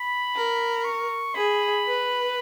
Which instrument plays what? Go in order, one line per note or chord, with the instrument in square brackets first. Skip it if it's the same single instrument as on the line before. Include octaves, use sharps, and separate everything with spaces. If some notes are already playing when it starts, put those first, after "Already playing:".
Already playing: [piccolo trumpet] B5
[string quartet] A#4
[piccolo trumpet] C#6
[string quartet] G#4 [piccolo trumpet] B5
[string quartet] B4